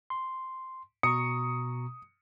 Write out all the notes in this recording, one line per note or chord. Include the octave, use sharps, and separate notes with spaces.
C6
B2 A#5 C#6 D#6 C#7